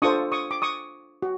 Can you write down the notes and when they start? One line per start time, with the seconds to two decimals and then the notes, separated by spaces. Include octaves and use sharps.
0.02 D4 F4 A4 C5 C#6 D#6
0.32 C#6 D#6
0.51 D6
0.62 C#6 D#6
1.22 F#4